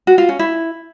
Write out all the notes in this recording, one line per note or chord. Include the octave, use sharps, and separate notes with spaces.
F#4
F4
C#4
E4